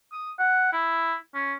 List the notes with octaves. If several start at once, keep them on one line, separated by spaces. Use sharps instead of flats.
D#6
F#5
E4
C#4